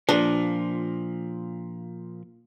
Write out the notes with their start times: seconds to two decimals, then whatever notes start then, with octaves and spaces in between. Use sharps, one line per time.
0.09 A#2 F3 D4